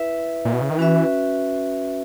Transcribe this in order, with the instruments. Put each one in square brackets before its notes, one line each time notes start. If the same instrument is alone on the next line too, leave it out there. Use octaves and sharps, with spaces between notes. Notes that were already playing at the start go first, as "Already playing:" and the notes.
Already playing: [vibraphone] E4 B4 E5
[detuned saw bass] A#2
B2
C#3
D#3
[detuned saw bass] E3 [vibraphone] C#4 F#4 B4 E5